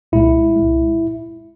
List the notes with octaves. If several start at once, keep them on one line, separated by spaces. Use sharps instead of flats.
C2 A#2 G#3 E4
C2 A#2 G#3